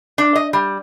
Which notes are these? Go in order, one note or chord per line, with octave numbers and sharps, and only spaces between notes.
D4
D#5
G3